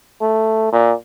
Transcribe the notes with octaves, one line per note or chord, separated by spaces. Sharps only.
A3
A#2